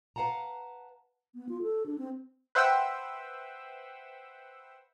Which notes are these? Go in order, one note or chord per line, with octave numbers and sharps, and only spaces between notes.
B4 F5 F#5 A5 A#5
B3
F4
A4
D4
C4
B4 C5 E5 F#5 G5 E6